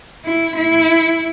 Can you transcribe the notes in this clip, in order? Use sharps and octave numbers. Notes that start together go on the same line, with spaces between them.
E4
E4